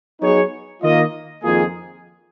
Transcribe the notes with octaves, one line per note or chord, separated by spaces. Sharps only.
F#3 B3 D#4 G#4 C#5
D#3 A#3 F4 A#4 D#5
F2 D#3 A#3 F4 G#4